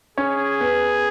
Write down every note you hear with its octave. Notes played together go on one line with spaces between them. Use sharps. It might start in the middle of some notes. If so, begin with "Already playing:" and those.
C#4 G#4 C#5
B3 B4